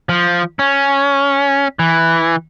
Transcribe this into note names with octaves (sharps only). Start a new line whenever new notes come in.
F3
C#4
E3